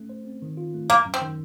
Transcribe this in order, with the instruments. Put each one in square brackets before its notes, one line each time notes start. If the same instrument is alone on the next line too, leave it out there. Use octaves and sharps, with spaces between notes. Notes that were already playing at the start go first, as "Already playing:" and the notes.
Already playing: [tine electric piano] A3 C#4
C5
C4
D#3
F4
A3
[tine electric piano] F#2 [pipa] A#3
[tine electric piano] F#2
[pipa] C4
[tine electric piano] D#3